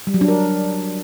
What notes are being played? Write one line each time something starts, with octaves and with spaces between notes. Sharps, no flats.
G3
F#3
D4
A#4